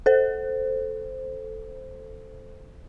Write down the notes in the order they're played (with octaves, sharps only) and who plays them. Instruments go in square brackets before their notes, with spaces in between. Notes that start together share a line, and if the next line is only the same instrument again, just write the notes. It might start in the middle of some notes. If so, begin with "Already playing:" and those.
[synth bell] A4 C5